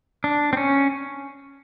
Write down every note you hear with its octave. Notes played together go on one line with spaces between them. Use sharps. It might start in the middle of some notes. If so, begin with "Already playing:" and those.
D4
C4
C#4